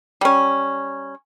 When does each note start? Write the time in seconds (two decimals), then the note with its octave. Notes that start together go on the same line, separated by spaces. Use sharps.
0.21 G3 C#4